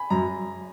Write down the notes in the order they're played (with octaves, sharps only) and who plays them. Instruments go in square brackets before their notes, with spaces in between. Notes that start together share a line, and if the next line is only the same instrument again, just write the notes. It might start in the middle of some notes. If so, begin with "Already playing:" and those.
Already playing: [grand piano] G#5 B5
[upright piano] F#2 [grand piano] A#5